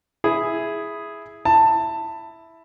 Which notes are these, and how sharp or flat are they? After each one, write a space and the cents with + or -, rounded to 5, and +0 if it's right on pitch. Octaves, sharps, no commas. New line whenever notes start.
E4 +0 G#4 +0
E4 +0 A5 +15